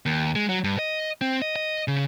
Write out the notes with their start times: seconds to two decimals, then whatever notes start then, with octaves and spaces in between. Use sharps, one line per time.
0.06 D#2
0.36 G#3
0.49 F#3
0.64 G2
0.79 D#5
1.21 C4
1.42 D#5
1.56 D#5
1.88 C#3